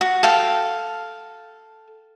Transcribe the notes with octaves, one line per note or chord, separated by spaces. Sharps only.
F#4
A4 F5 G5